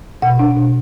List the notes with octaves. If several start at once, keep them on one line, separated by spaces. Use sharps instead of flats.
B2 F#5
D4
B2